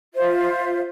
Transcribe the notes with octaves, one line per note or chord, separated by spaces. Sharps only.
F4 C5 E5